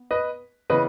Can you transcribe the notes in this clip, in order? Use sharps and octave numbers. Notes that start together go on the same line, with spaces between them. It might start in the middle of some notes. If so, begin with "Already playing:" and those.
Already playing: B3
B4 D#5
C#3 E3 B3 B4 D#5